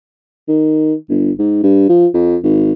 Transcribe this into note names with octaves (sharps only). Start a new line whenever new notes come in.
D#3
G1
G#2
G2
F3
F2
G#1